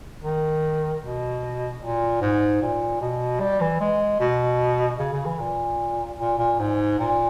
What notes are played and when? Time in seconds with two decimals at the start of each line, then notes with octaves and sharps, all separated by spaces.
0.22 D#3
1.02 B2
1.81 A#2
2.21 G#2
2.62 A#2
3.01 B2
3.40 G3
3.61 E3
3.80 G#3
4.20 B2
4.99 C#3
5.13 C#3
5.26 E3
5.40 A#2
6.19 A#2
6.38 A#2
6.59 G#2
6.99 A#2